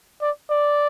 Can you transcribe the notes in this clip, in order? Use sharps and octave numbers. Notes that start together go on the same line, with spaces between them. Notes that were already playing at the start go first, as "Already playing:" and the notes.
D5
D5